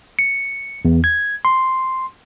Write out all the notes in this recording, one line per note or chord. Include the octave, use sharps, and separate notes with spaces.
C#7
E2
G#6
C6